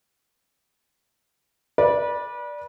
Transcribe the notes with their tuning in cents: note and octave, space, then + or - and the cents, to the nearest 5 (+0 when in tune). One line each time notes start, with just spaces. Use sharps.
B4 -30 D5 +0